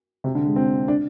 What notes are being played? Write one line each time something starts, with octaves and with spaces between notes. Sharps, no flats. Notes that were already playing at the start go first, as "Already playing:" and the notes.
C3
D3
G#3
C4
D4